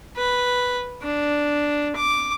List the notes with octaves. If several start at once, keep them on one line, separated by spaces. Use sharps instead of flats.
B4
D4
D6